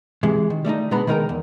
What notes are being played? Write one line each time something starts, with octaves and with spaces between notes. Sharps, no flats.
C3 E3 G#3
D#3
G3 A3 C4 D#4
B2 G#3 B3 D4 A#5 B5
D#3 G#3 D#4 A#4 G5 A#5
E2